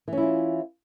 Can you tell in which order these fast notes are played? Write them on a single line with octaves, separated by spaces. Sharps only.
E3 C#4 E4 F4